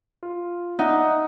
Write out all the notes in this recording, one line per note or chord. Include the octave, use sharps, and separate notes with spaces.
F4
D#4 D5 E5 F#5